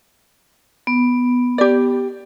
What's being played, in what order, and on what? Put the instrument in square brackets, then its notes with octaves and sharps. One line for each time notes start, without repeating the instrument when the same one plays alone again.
[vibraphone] B3
[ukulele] G4 D5